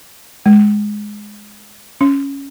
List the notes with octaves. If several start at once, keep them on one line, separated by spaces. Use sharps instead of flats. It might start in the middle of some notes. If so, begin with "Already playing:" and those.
G#3
C#4